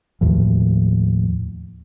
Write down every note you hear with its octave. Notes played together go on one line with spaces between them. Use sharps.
D#2 A2 F3